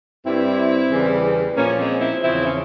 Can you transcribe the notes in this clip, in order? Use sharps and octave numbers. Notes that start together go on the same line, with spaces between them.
G2 G3 C4 E4
E2 C#3 E3 G3
A#2 F3 A#3 C#4
G#3 C4
C4 E4
E2 C#3 F3 C4 E4
C#4